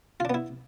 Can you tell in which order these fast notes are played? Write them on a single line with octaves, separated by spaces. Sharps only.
F4 D4 B3 E4